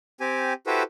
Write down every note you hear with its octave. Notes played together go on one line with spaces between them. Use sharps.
C4 G4 G#5
E4 F#4 G4 A4 B4 C5